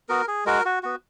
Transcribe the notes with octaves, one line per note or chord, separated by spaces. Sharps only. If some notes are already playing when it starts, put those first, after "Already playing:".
B3 F#4 A#4
G#4
G#3 F#4 A#4
F#4
B3 F#4